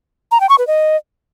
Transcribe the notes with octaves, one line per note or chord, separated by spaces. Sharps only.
A#5
G5
C#6
B4
D#5